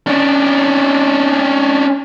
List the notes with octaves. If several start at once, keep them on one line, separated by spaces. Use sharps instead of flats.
C#4 D4